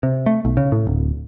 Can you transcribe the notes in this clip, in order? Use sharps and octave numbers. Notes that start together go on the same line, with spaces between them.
C3
A3
B1
C#3
A2
D1